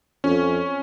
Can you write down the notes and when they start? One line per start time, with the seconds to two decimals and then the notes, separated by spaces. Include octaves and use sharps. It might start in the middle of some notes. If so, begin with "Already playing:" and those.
0.24 F2 C#4